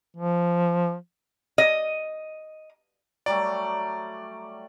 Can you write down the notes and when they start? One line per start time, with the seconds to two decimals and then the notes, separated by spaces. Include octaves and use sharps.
0.17 F3
1.58 D#5
3.26 F#3 G3 A3 D5